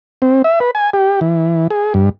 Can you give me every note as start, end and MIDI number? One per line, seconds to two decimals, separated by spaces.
0.22 0.42 60
0.44 0.59 76
0.60 0.71 71
0.75 0.90 80
0.94 1.20 67
1.21 1.67 52
1.70 1.93 68
1.94 2.09 43